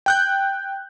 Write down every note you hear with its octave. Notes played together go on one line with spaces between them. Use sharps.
G5 F#6 G6